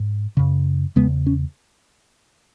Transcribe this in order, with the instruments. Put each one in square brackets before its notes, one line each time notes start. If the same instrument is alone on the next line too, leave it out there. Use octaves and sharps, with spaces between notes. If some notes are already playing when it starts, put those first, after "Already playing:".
Already playing: [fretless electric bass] G#2
F#2 C#3
E2 C#3 G#3 B3
C#4